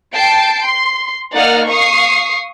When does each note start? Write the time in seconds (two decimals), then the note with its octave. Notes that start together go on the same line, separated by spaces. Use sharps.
0.14 G5 A5 C7 D7
0.65 C6
1.34 A#3 D#4 D5 F#5 D#6 F6
1.69 F5 C#6 D#6 C7